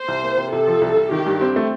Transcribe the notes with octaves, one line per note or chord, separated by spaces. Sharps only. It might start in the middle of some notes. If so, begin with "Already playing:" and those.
Already playing: C5
C2
A#3
C3
C3 A4
F3
C2
C2
D#3 G4
G2
C4
A3